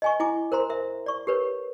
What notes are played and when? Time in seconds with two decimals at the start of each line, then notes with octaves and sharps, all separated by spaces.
0.02 D#5 G#5 C#6
0.20 E4 G#5 D6
0.52 A#4 C5 A#5 C6
0.70 A#4 E5
1.06 D5 C#6
1.27 G4 A#4 B4 C#5